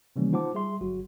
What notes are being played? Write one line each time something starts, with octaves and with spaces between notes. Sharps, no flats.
C3 D#3 E3 G3 A#3 C#4
D#4 F4 C5 F#5 A5 D6
G3 G#4 E5 C6
G1 F#3 F#4